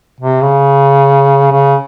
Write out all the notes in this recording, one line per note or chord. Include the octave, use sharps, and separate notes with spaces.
C3
C#3
C#3